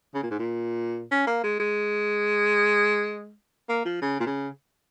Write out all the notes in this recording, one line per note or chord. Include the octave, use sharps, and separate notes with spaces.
C#3
A#2
G#2
A#2
C#4
A#3
G#3
G#3
A#3
F3
C#3
A#2
C#3